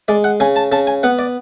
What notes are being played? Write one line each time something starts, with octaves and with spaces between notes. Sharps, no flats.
G#3 D5
F#5
C#3 G#5
A5
C#3 A5
G#5
B3 F#5
D5